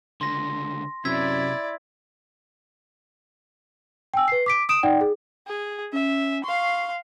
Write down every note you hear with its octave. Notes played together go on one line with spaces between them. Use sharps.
C#2 D3 C6 A#6
F#2 C3 E4 D5 E6 G#6 B6
G5 G#5 E6
B4 C7
D6 B6 D7
D#6 D7 E7
D#4 D5 F#5 G5
G#4
G#4
C#4 E5
F5 C6 C#6